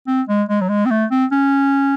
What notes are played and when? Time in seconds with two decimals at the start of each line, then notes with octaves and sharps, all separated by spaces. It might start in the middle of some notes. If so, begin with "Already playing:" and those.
0.07 C4
0.29 G#3
0.49 G#3
0.61 F#3
0.69 G#3
0.86 C4
0.91 A3
1.11 C4
1.32 C#4